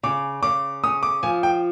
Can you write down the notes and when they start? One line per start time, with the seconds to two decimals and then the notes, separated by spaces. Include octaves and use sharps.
0.03 C#3 D6
0.43 C#3 D6
0.83 C#4 D#6
1.03 D6
1.23 F3 G#5
1.43 G5